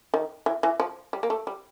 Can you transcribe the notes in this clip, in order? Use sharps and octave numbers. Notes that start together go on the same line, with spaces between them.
D#3
E3
E3
F3
G3
A#3
A3
G3